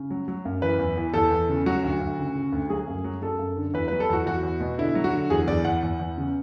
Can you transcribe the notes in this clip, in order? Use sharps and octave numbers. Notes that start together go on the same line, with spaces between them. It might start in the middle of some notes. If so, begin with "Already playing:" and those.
Already playing: C#3
F#3
F#3
F#2
E3 B4
E2
E3
E2 A4
E2
C#3
F#3 F#4
D2
D2
C#3
C#3
D2
F#3 G#4
F#2
F#3
F#2 A4
F#2
D3
E2 B4
F#3 B4
A4
E2 F#4
E2 F#4
E2
B2
D3 E4
F#3
F#4
D3
E2 G#4
E2 D5
E2 F#5
E2
E2
C#3